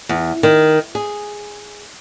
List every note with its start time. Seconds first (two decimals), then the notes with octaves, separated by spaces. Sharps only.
0.09 E2
0.43 D#3
0.95 G#4